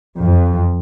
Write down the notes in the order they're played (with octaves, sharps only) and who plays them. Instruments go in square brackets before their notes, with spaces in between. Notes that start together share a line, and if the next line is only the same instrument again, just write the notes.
[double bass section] F2